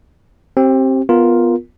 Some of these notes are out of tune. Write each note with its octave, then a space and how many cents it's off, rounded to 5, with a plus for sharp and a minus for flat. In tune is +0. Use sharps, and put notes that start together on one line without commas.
C4 +20 G4 -20
B3 +0 F4 +0 A#4 +5